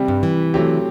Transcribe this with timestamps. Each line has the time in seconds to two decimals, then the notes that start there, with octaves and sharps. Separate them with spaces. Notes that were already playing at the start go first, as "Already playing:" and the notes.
Already playing: C3 G3 C4
0.08 G2
0.23 E3
0.54 C3 F#3 A3 C4 G4